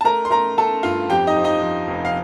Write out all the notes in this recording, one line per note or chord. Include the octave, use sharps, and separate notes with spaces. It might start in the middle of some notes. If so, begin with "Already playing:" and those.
A5
A3 A#4 A#5
C6
A3 A#4 A#5
A3 A4 A5
G2 F4 F5
F2 G4 G5
D#4 D#5
F3
D#4 D#5
F3
F1
F5